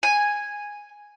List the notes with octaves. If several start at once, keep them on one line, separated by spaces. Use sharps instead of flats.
G#5